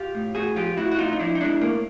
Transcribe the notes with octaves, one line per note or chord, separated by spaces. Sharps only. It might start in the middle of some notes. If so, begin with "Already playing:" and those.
Already playing: F4 G4
A2
A2 F#4 G#4
F3 F4 G4
A2 E4 F#4
F#4
A2 D#4 F4
D#4
F3 D4 E4
D#4
G#3 D4 E4
A2 A#3